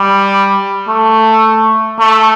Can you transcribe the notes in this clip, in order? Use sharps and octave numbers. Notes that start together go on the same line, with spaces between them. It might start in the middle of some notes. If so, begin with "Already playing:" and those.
Already playing: G3
A3
A3